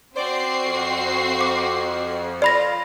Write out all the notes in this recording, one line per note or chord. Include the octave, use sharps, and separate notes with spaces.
C4 F#4 C5 D5 C7
F2
D6
F4 D5 B5 A#6